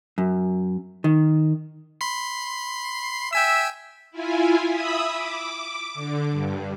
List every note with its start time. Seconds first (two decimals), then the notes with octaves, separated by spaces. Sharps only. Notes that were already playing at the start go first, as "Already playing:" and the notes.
0.18 F#2
1.04 D#3
2.01 B5 C6 C7
3.33 E5 G5 G#5 E6
4.11 E4 F4 G#5
4.67 E5 B5 D#6 E6
5.13 D6
5.94 D3
6.31 G2